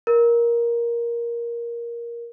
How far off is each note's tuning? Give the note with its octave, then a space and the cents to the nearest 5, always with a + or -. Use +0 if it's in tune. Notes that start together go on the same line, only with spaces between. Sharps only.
A#4 +10